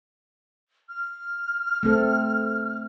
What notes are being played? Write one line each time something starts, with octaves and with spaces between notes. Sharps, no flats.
F6
A3 C4 A4